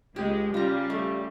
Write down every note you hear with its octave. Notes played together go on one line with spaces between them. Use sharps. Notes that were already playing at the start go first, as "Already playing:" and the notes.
C#2 G#3 G4
C#3 G3 F4 A#5
A3